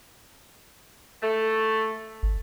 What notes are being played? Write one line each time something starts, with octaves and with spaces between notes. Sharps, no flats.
A3
G#1